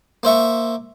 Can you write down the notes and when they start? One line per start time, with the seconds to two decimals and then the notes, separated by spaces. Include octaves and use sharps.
0.23 A#3 C5 E5 C#6